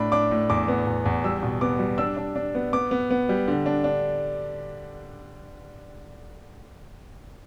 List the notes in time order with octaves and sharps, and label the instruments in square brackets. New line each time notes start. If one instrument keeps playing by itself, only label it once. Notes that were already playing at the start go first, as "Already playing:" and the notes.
Already playing: [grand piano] A2 D4 B5
D4 D6
A2
E2 D6
B3
E2
E2
G3 E6
B2
B3 D6
G3
D4 E6
D4
D4
B3
B3 D6
B3
B3
G3
D3
D4
D4